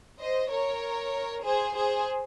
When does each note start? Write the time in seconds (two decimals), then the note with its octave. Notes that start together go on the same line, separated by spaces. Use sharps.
0.21 C5 D#5
0.52 A#4 C#5
1.44 G#4 C5
1.75 G#4 C5